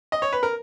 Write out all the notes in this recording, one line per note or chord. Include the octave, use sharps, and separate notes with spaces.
D#5
C#5
B4
A#4